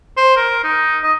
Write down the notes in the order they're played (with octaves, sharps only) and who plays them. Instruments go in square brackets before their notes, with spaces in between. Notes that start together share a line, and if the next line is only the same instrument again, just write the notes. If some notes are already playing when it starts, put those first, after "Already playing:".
[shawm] C5
A#4
D#4
D#5